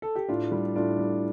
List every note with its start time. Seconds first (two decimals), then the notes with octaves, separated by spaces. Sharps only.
0.02 A4
0.15 G4
0.28 A2 D4 F4
0.51 G3
0.75 A2 D4 F4
0.98 G3